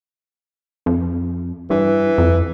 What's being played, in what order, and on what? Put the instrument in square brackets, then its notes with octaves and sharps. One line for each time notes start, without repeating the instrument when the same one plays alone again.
[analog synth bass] F2
[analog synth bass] G2 [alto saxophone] E3
[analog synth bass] F2